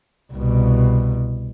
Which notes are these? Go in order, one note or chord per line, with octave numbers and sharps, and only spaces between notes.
C2 B2